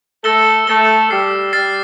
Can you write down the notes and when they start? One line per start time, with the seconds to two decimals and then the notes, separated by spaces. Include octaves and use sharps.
0.24 A3 A4 E6 A#6 E7 G7
0.67 A3 A4 E6 A#6 E7 G7
1.10 G3 G4 F6 A6 C7
1.53 G3 G4 F6 A6 C7